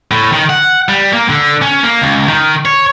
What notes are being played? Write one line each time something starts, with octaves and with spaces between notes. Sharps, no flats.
A2
D#3
F#5
G3
A#3
D3
C#4
A#3
C#2
D#3
C#5